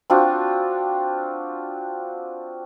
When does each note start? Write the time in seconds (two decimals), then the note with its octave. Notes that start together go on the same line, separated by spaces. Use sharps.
0.10 C4 D4 F4 F#4